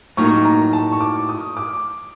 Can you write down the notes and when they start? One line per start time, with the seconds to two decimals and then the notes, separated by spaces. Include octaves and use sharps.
0.17 A2 F#3 A#3 D#4 C#6
0.45 A#5
0.73 A5
0.92 C#6
1.01 D6
1.29 D#6
1.57 D6